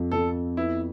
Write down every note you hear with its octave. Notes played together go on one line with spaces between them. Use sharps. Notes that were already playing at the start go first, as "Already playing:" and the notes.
Already playing: F2
F2 A4
B3 E4